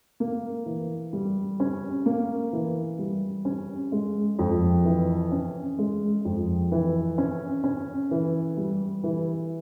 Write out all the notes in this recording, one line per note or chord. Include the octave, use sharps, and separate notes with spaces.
A#3
E3
G3
C#4
A#3
E3
G3
C#4
G#3
F2
E3
C#4
G#3
F2
E3
C#4
C#4
E3
G3
E3